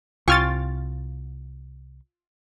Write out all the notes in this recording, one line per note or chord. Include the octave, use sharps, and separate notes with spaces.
C2 F4 G5 G#5 C#6 F6 A6